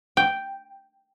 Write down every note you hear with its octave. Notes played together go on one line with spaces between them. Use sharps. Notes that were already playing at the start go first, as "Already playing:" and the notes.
G5